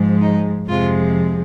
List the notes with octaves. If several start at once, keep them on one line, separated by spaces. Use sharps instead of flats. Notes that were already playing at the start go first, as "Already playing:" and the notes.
Already playing: G#2 F3 G#3
D#4
F2 C3 F3 G#3 F4